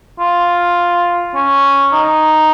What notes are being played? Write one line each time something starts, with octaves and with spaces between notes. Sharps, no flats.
F4
C#4
D#4